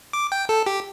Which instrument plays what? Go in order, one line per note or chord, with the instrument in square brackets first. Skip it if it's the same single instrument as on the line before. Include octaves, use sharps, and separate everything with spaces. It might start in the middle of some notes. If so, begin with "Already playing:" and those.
[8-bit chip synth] D6
G5
A4
G4